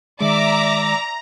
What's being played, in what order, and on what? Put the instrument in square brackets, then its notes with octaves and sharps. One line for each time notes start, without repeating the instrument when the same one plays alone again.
[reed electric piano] D#3 G#3 [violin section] D5 E5 D6 [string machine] A#5